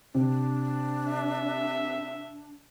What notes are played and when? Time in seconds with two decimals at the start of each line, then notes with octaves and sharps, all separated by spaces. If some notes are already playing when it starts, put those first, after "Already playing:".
0.15 C3 D4
1.13 E5